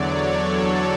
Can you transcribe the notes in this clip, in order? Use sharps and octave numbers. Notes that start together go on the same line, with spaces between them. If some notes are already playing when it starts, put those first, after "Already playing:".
Already playing: E2 D3 F#3 C#5 D5
A4